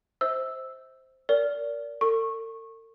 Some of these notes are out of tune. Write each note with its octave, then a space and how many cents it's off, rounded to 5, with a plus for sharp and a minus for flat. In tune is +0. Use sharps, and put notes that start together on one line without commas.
C5 +0 E5 -40 E6 +0
A#4 +0 D5 -25
A4 +45 C#6 -20